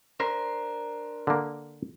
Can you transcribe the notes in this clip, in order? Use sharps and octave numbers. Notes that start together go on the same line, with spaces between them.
D4 A#4 C5
D3 A#3